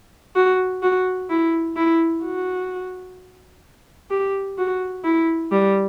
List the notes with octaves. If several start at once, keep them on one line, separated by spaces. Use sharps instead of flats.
F#4
F#4
E4
E4
F#4
G4
F#4
E4
G3